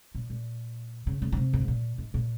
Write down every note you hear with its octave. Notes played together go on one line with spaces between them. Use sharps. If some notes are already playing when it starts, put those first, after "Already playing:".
A#2
A#2
C#3
C#3
C#3
C3
G2
G#2
A#2
G#2
A#2